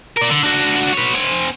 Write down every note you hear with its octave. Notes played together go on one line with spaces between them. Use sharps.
A#4 D5
D3
D4 F#4
B4 C#5
C4 G#5